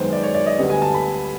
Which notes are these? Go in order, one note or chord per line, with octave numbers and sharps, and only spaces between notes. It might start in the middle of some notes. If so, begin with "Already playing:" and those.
Already playing: F#2 D#3 G#3 B3 C5
D5
C#5
D5
D#5
D2 D3 G3 B3
G#5
A5
B5